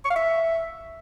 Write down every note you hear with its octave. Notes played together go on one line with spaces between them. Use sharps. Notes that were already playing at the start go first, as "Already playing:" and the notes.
C#6
F5
E5